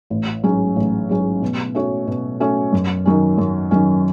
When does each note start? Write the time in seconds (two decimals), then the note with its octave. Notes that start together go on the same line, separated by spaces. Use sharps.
0.10 A1
0.44 G#2 F#3 C#4
0.76 A1
1.09 G#2 F#3 C#4
1.42 B2
1.75 A3 C#4 F#4 C#5
2.07 B2
2.40 A3 C#4 F#4 C#5
2.73 F#2
3.06 D#3 F#3 C#4
3.38 F#2
3.71 D#3 F#3 C#4